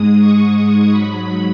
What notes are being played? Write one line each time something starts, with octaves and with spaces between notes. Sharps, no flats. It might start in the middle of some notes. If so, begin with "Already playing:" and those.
Already playing: G#2 G#3 D#6
C#6
D#6
G#2 F#3 B5